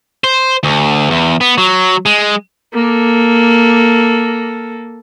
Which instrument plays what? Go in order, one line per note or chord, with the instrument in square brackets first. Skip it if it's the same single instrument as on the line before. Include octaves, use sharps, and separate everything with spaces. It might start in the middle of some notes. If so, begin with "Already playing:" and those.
[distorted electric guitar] C5
D2
E2
B3
F#3
G#3
[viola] A#3 A4